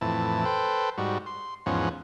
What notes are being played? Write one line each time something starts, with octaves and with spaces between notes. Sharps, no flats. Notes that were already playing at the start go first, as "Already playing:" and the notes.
F2 A2 E3 A5
A4 B4 C5 G5
G#2 G3 F#4
C6
E2 G#2 F3 C#4 F#5